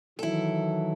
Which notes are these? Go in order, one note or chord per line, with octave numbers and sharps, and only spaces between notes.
D#3 E3 F#3 E4 A4